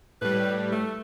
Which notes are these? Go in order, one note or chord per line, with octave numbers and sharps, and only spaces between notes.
A2 G3 B4
A3